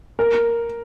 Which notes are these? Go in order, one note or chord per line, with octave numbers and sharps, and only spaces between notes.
A#4